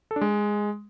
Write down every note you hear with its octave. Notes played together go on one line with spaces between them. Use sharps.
A4
D4
G#3